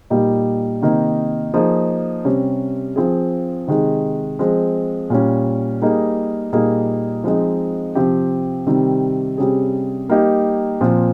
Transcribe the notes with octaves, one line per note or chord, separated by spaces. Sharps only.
A#2 G3 A#3 D#4 G4
C3 D#3 A#3 D#4
F3 A#3 D#4 G#4
C3 G3 C#4
F3 C4 F4 G#4
C3 D#3 G#3
F3 G#3 C4
A#2 G3 C#4
G3 A#3 D#4 G#4
A#2 G3 A#3 D#4 G#4
F3 G#3 C4 D#4
C3 F3 C4 G4
C3 D#3 G3 C4
C3 G3 C#4 G#4
G3 A#3 D#4 G4
A#2 F3 C4